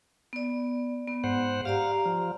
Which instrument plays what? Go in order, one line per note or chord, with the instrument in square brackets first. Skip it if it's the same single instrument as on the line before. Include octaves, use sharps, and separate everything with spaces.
[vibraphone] B3 D5
B3
[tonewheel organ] G#2 C5 F#5
[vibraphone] G4 D5 A#5 [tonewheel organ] F5
[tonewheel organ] F3